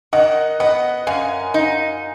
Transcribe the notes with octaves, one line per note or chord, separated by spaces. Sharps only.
D#3 D#5 F#5
B3 D#5 F#5
F#2 F5 G#5
D#4